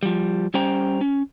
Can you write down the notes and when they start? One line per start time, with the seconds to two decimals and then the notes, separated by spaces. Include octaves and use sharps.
0.03 F3 G3
0.54 G3 C#4 G4 C5 G5 A#5
1.01 C#4